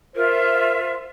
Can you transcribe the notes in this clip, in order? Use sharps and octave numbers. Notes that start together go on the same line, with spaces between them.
F4 A#4 C5 E5